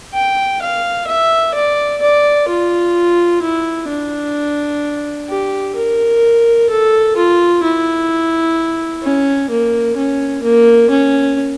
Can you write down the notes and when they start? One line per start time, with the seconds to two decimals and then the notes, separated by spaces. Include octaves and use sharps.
0.14 G5
0.62 F5
1.07 E5
1.55 D5
2.02 D5
2.48 F4
3.42 E4
3.89 D4
5.29 G4
5.76 A#4
6.70 A4
7.17 F4
7.63 E4
9.03 C#4
9.50 A#3
9.97 C#4
10.43 A#3
10.90 C#4